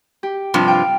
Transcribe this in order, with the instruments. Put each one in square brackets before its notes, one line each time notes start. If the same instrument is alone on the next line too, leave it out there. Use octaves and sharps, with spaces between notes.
[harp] G4
[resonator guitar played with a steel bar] G2 C3 F3
[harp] F5 G5